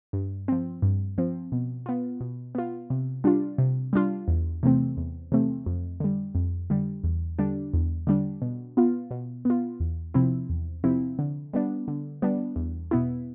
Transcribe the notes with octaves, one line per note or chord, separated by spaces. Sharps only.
G2
F3 C4
G2
F3 C4
B2
B3 F4
B2
B3 F4
C3
G3 D4 F4
C3
G3 D4 F4
E2
C3 E3 A3 C4
E2
C3 E3 A3 C4
F2
D3 G3
F2
D3 G3
E2
D3 G3 D4
E2
D3 G3 D4
B2
B3 F4
B2
B3 F4
E2
C3 F3 C4 E4
E2
C3 F3 C4 E4
D3
G3 B3 D4
D3
G3 B3 D4
E2
B2 B3 E4